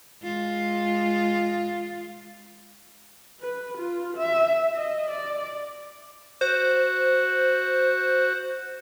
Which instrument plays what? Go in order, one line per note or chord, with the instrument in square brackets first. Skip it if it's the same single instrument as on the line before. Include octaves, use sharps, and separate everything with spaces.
[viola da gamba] G#3 F4
[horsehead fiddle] B4
F4
E5
D#5
D5
[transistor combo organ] F#4 [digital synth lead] C5